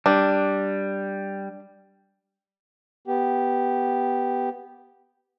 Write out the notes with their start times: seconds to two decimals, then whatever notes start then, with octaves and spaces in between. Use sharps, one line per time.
0.06 G3 D4
3.07 B3 G4